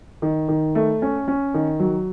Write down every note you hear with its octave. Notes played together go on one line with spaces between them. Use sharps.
D#3
D#3
A3
C#4
C#4
D#3
F#3